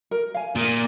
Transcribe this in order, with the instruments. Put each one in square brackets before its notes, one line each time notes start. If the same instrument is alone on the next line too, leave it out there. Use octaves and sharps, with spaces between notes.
[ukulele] A#4
F5 G#5
[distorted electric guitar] A#2 [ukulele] G#4